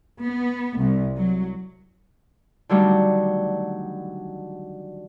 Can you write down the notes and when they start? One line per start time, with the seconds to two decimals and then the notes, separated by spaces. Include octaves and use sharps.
0.21 B3
0.77 C2
1.17 F#3
2.69 D3 D#3 F#3 G3 A3